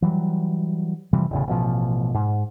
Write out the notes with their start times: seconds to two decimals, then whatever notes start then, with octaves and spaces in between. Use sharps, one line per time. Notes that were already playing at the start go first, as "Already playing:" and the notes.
0.02 E3 F#3 G3
1.13 C3 E3 F3 G3
1.31 E1 A1 C#3
1.47 A1 B2 F3
2.14 G#2